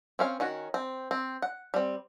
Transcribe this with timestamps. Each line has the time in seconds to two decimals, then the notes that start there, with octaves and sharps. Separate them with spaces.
0.19 C4 C#4 F5
0.40 D#3 C#4 F#4
0.74 C4
1.11 C4
1.42 F#5
1.74 G3 C4